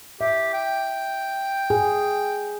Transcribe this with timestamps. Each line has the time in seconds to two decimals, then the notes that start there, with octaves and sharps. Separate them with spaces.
0.21 G4 E5
0.53 G5
1.70 G#4